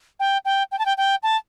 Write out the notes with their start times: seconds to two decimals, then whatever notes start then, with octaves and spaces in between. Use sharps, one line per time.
0.20 G5
0.45 G5
0.72 G5
0.79 A5
0.86 G5
0.97 G5
1.23 A5